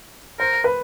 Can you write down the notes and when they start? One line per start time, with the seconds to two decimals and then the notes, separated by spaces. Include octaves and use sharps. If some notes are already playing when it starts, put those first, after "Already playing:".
0.40 A#4 C5
0.64 B4